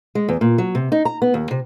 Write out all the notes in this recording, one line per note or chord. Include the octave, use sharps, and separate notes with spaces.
G#3
E2
A#2
F#3
C3
D#4
A#5
B3
D#2
C3